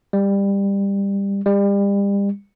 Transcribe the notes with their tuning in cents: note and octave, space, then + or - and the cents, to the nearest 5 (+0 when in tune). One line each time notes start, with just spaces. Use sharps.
G3 +20
G3 +35